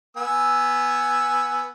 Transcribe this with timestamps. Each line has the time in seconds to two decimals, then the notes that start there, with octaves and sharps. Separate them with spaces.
0.17 B3 G#5 E6